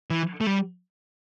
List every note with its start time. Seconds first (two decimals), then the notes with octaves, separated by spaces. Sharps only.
0.10 E3
0.41 A3
0.47 G3